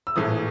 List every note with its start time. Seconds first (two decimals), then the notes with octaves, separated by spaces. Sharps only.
0.07 E6
0.16 A#1 A2 E3 D#6